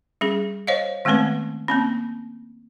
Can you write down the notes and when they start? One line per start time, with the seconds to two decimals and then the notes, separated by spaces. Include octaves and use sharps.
0.21 G3 C#4 G#4
0.67 C5 C#5 D#5 F5
1.05 D#3 G#3 A3 B3 C4 B4
1.68 A#3 C4 C#4